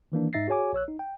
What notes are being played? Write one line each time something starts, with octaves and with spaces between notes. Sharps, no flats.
D#3 E3 A#3 D4
G#2 D#4 E5 A6 A#6 C7
F#4 G#4 C#5 G#5 D6
A#1 C#5 E6 F#6
D#4
G5